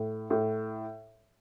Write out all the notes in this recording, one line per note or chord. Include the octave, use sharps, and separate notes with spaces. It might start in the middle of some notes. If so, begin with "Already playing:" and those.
Already playing: A2
A2